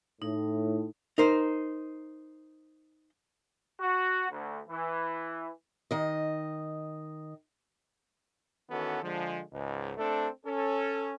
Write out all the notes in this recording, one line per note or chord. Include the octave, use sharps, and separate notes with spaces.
A2 D#4
D#4 A#4 C5
F#4
D2
E3
D#3 D#5
D#3 E3 B3 C#4 F#4 A4
D3 F3 G#3
C#2 G#2
A3 C4 D4 A4
C#4 A4